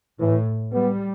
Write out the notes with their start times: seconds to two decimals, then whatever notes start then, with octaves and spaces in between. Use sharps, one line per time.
0.19 A2 E3
0.72 G3 B3